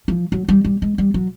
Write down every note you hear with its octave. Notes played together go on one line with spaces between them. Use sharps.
F3
F#3
G3
G3
G#3
G3
F#3